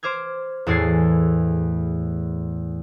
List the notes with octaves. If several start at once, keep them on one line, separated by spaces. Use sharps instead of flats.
C5 D6 F6 G#6
E2 A2 E4 G#4 A6 C7